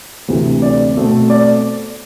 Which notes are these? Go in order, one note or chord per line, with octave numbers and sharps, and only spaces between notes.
D2 C3 E3 A3 C4
D5
B2 A3 C4
D5